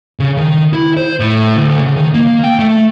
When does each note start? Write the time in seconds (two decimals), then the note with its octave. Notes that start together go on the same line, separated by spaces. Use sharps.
0.20 C#3
0.37 D#3
0.73 E4
0.97 C5
1.20 A2
1.57 D2
1.81 C#3
1.96 D#3
2.14 A#3
2.44 G5
2.59 A3